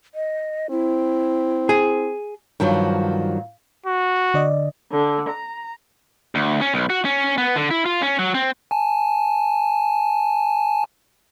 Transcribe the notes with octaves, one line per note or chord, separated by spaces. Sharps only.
D#5
C4 E4
G#4
G2 D#3 F3 F#3
F#4
D3 D5 D#5
D3
A#5
D2
C#4
B1
F#4
C#4
B3
D3
E4
F4
C#4
F#3
C4
G#5 A5